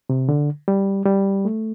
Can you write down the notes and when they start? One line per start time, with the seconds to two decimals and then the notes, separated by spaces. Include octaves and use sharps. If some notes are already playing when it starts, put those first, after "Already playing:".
0.10 C3
0.29 D3
0.68 G3
1.06 G3
1.45 A3